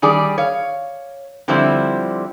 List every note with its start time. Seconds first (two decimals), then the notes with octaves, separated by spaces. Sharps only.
0.02 D#3 G3 G#4 D5
0.38 C#5 F5
1.48 D3 F3 G3 C4 E4 C5